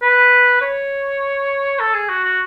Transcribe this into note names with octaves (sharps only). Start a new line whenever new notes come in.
B4
C#5
A4
G#4
F#4
F#4